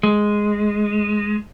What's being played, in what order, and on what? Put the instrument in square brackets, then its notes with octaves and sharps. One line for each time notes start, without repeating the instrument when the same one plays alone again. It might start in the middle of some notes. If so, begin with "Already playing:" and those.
[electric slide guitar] G#3